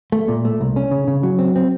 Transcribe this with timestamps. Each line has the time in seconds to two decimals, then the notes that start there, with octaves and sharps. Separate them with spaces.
0.12 A3
0.28 A#2
0.45 A3
0.61 C2
0.76 C#4
0.91 C#3
1.08 C#3
1.23 F#3
1.39 C4
1.56 C4